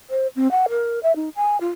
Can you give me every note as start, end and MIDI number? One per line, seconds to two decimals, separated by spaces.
0.10 0.27 72
0.36 0.50 60
0.51 0.66 78
0.70 1.00 70
1.03 1.15 76
1.16 1.29 63
1.36 1.60 80
1.61 1.69 65